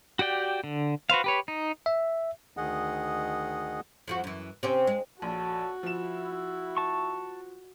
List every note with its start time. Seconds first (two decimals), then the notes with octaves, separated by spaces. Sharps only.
0.19 F#4 G4 D5 G5
0.64 D3
1.10 F#4 B4 C5 F5
1.24 G4 B4 C#5
1.48 D#4
1.86 E5
2.57 D2 D#3 G#4 D#5 F#5
4.08 F2 F3 F#4
4.24 F#2 E3
4.63 C3 C4 C#4
4.87 G#3
5.22 A#1 F#4 A4 C#5 A5
5.83 F3 E4 E7
6.77 A5 C#6